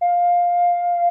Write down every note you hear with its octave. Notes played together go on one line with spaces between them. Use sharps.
F5